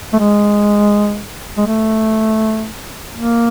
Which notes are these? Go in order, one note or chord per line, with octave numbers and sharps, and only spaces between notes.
A3
G#3
G#3
A3
A#3